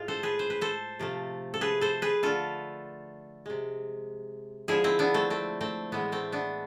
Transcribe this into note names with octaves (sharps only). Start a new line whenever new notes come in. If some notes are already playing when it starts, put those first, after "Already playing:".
Already playing: A2 G#3 F4
A4 C5
G#4 B4
C5
B4
A4 C5
C3 F3 A3
A4
G#4 B4
A4 C5
G#4 B4
D3 A3 F4 A4
C3 G#3
D3 F3 G#3 E4 G#4
C4 E4
B3 D4
A3 C4
A3 C4
A3 C4
A2 E3 G#3 B3
A3 C4
B3 D4